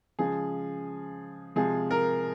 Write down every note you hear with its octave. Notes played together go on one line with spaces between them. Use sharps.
C#3 F3 G#3 G#4
C3 F3 G#3 G#4
A#4